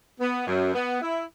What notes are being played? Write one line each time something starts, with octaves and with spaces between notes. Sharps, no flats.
B3
F#2
B3
E4